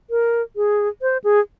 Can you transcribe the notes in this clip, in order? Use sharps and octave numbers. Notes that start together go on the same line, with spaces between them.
A#4
G#4
C5
G#4